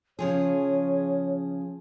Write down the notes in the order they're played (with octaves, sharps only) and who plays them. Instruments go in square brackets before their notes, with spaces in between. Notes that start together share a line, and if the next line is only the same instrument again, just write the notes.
[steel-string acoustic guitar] C#3 F3 G#4 [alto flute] C#5